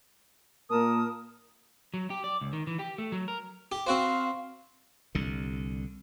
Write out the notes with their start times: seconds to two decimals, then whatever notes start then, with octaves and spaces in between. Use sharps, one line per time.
0.70 A#2 A#3 A#4 A5 D#6
1.94 F#3
2.10 G4
2.24 D5
2.41 C#2
2.53 D#3
2.67 E3
2.79 G4
2.98 A3
3.12 F#3
3.28 A#4
3.72 G4
3.87 C4 F#4 C5 F5
5.15 C2 D3